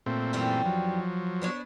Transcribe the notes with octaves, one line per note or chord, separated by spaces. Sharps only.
A#2 A3 C4
F#2 E3 G3
F3 F#3
B3 D4 C#5